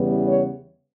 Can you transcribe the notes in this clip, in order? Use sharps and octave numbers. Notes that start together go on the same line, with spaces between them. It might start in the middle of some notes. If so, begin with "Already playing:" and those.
Already playing: E2 C#3 E3 G3 B3
C#5